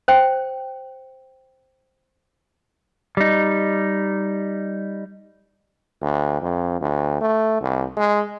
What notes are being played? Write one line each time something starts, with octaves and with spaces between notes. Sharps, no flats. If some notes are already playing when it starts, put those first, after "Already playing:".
C5 G5
G3 D#4
D2
F2
D2
A3
C2
G#3